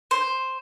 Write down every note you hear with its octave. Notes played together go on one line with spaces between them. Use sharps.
C5